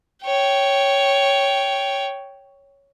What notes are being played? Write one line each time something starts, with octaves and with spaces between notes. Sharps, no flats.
C#5 G5